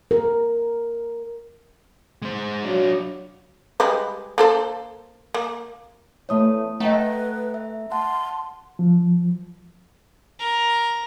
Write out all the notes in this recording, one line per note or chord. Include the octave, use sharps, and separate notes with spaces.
A#4
G#3 C5
F#3 D4 F4
G3 G#3 B4
A#3 A4 C5
A#3
E2 A3 C#5 D#6
A3 B4 D#5 F#5 G5 A#5
E5
F#5 A5 C6
F3
A#4